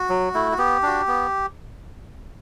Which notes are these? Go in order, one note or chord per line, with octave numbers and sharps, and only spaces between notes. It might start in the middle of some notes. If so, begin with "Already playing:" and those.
Already playing: F#4
F#3
A3 E4
F#4
B3 G4
D4 F#4
B3